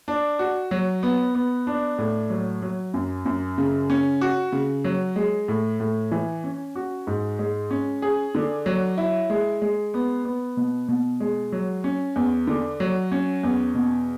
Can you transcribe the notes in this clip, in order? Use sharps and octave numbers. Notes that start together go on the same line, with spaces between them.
D4
F#4
F#3
B3
B3
D4
A2
F#3
F#3
F#2
F#2
C#3
C#4
F#4
C#3
F#3
G#3
A2
A2
E3
C#4
F#4
G#2
G#3
C#4
G#4
D3
F#3
E4
G#3
G#3
B3
B3
B2
B2
G#3
F#3
C#4
E2
D3
F#3
C#4
E2
B2